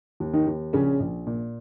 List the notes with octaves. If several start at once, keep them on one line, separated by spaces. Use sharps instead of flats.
D#2
D#3 D#4
D#2
A#1 C#3 C#4
A#1
A#2